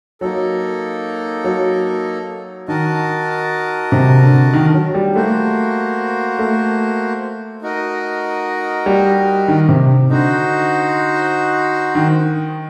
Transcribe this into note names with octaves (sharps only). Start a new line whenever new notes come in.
F#3 A#3 D#4 A4
F#3
D#3 F#4 A#4 D#5 A5
C3
D3
D#3
F#3
G3
A3 A#3 F#4 C5
A3
D#4 F#4 A#4 D#5
G3
D#3
C3
D3 D#4 F#4 C5
D#3